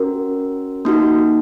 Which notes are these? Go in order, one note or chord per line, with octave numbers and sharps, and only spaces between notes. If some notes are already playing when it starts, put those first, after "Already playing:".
Already playing: C#4 F#4 A#4
A#3 D#4 F#4